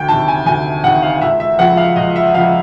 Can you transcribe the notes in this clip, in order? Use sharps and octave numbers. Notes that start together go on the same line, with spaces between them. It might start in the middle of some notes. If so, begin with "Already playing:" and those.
Already playing: D2 G5
C3 D#3 A5
G#5
D2 G#5
C3 D#3 F#5
F5
C#2 E5
E5
C#3 F3 F#5
F5
C#2 D#5
E5
C#3 F3 F5